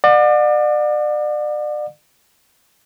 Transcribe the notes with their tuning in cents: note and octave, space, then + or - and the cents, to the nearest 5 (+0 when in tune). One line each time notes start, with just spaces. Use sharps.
D5 +35 F#5 -40